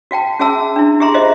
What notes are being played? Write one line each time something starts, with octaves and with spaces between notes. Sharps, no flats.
F#4 F5 G5 A5
C#4 F#4 G#4 E5 A5 E6
D4 E4
G4 G#4 E5 A#5 C6
F4 G4 C5 D#5 E5